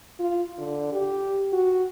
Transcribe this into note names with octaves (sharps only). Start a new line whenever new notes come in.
F4
D3
G4
F#4